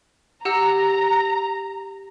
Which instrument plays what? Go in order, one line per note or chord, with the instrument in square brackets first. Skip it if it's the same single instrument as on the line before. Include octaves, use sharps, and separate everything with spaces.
[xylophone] G4 F#5 E6 [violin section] A#5